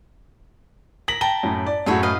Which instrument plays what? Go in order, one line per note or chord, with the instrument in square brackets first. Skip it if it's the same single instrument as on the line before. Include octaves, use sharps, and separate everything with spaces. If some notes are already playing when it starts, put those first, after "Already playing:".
[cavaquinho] A#4 [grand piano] A#6 B6 F#7
[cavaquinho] G5 A5 A#5 [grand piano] G7
[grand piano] F#2 A2
D5
[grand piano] F#2 A2 F#4 [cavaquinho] G#4 A4 C#5
[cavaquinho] B4 D#5 F5